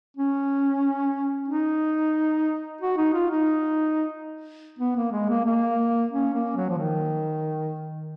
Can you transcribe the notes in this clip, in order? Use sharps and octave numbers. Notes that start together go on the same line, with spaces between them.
C#4
D#4
F#4
D#4
F4
D#4
B3
A#3
G#3
A#3
A#3
C#4
A#3
F#3
F3
D#3